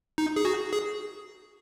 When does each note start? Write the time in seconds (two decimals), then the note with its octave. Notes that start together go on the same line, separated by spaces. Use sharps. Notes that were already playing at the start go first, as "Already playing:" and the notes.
0.18 D#4
0.36 G#4
0.45 F#4
0.73 G#4